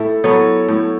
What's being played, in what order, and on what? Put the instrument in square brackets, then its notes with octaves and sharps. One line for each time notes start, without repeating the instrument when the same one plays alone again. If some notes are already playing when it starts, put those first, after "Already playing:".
Already playing: [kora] A2 [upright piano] E4 A4
[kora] F#3 B3 [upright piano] A4 C#5
[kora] A2